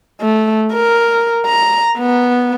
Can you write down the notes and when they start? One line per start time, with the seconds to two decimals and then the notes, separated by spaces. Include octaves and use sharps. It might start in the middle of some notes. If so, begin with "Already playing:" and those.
0.20 A3
0.72 A#4
1.46 A#5
1.98 B3